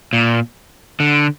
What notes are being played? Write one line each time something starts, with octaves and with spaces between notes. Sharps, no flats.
A#2
D3